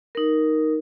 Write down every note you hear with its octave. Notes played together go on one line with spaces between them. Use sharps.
D#4 A#4